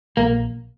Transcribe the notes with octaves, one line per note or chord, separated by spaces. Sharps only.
A#1 A#3